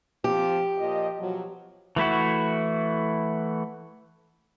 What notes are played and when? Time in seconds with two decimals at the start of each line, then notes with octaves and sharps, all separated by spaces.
0.24 F3 C4 G4
0.79 A#2 F3 D#5
1.20 B2 F3 F#3
1.96 E3 A3 E4 F#4